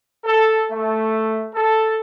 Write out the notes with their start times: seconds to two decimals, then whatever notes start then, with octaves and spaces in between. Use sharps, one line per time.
0.24 A4
0.71 A3
1.54 A4